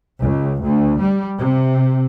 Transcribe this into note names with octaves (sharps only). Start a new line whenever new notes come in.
C#2
D2
G3
C3